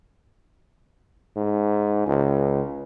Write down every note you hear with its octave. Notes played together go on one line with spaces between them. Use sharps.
G#2
C#2